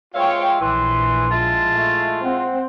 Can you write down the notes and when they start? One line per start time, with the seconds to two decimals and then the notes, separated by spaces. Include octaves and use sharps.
0.14 G#3 F4 C#5 E5 F5 G5
0.61 A#1 E3 C6
1.31 G#3 E4 F4 A5
1.75 A3
2.24 C4 F#5